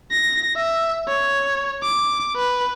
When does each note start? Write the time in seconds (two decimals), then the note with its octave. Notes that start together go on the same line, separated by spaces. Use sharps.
0.12 A#6
0.56 E5
1.08 C#5
1.83 D6
2.36 B4